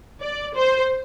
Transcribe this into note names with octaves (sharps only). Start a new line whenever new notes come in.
D5
C5